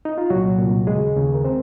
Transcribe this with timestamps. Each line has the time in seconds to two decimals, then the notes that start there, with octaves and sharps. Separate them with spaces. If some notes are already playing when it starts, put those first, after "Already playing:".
0.05 D#4
0.18 F4
0.30 C2 A#2 F#3 F#4
0.58 C2 A#2
0.87 D#2 C#3 G#3 G#4
1.16 D#2 C#3
1.34 A#4
1.44 C4 C5